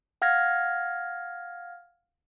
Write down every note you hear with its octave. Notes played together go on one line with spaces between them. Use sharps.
F5 F#5 F6 G#6 A#6